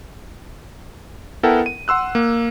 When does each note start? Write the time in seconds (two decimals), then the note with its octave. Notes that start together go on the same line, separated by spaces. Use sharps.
1.43 B3 E4 A4 A#4 F#5 G5
1.66 D#7
1.88 F#5 C6 E6 F#6
2.15 A#3